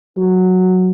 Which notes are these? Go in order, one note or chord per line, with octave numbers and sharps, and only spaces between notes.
F#3